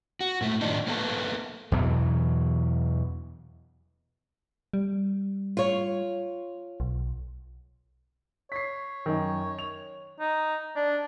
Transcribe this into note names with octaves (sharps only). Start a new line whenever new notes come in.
F#4
G#2 A3
A2 D#3 F3 D4 D#4
A#3 B3 A4
E2 B2 E3 F#3
G3
F4 C#5
B1
C#5 B6 C7
F#2 D#3
F7
D#4
D4